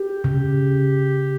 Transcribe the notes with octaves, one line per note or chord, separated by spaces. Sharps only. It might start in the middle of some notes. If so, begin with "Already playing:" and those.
Already playing: G4
C#3